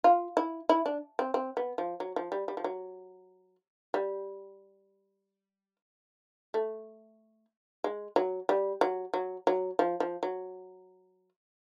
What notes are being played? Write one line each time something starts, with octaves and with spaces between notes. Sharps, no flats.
F4
E4
E4
D4
C4
C4
B3
F3
F#3
F3
G3
G3
F3
F#3
G3
A3
G#3
F#3
G3
F#3
F#3
F#3
F3
F3
F#3